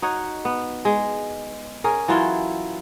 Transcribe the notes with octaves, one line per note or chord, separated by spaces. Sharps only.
D#4 F#4 C#5
B3
G#3
C#4 G#4 A#4
E3 F#3 E4 F4